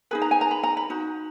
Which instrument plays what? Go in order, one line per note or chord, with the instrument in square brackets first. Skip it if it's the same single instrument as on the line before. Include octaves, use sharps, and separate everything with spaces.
[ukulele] D#4 G#4 B4 B5
A#5
G#5
A#5
B5
A#5
B5
D#4 F#4